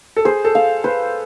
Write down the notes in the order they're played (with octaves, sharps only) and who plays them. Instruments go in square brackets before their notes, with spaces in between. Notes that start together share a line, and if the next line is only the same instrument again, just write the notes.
[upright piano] A4
[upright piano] G#4 [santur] C5
[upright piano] A4
[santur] F5
[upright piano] B4 [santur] C5